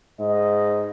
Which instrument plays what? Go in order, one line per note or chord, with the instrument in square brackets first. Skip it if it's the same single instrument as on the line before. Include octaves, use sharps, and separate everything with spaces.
[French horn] G#2 [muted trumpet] D#5